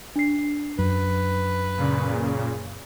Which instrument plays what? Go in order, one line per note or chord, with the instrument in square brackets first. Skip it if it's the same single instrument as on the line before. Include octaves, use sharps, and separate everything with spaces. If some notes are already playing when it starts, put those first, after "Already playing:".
[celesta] D4 C7
[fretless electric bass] F#2 [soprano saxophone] B4
[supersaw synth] A#2 C#3